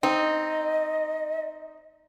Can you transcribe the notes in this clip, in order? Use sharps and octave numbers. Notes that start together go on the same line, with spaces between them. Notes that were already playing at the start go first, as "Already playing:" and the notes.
C4 D#4 D#5